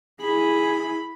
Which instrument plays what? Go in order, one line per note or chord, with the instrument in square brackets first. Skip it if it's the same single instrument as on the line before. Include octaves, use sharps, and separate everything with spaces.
[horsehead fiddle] E4 G#4 [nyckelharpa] B5